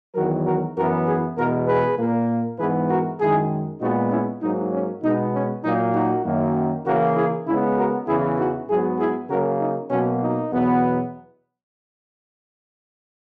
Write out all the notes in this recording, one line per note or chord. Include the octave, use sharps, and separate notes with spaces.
E2 D#3 F#3 F#4 A#4
F#4 A#4
F#2 E3 B3 F#4 A#4
E4 G#4
E2 B2 G#3 F#4 A#4
G#4 B4
A#2 A#3
G#2 E3 G#3 B3 G#4 B4
F#4 A#4
F#2 D#3 G#3 E4 G#4
A#2 G#3 B3 D#4 F#4
C#4 E4
G#2 F#3 A#3 D#4
C#4
B2 G#3 B3 D#4
C#4
A#2 F#3 A#3 D#4
D#4 F#4
F#2 D#3 A#3
C#3 E3 A#3 F#4 A#4
E4 G#4
C#3 G#3 B3 C#4 E4
F#4 A#4
E2 C#3 E3 E4 G#4
D#4 F#4
G#2 F#3 B3 E4 G#4
E4 G#4
C#3 F#3 A#3 F#4 A#4
D#4
B2 F#3 A#3 C#4
D#4
E2 B2 F#3 B3